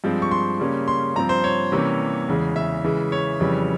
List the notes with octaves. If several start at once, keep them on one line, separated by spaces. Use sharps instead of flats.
G2 F3 G#3 C4
C#6
C6
C#3 G3 A#3 C#4
C6
G2 F3 C4 A#5
C5
C#5
C3 E3 G3 A#3 C#4
E2 C#3 E3 G#3
E5
C#3 E3 G#3
C#5
F2 C#3 E3 G3